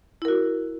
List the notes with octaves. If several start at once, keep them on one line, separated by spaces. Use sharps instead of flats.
E4 F#4 A#4